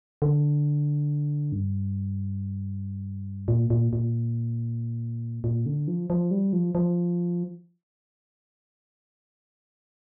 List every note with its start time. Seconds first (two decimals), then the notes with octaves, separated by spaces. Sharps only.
0.22 D3
1.52 G2
3.48 A#2
3.70 A#2
3.93 A#2
5.44 A#2
5.66 D3
5.88 F3
6.10 F3
6.31 G3
6.53 F3
6.75 F3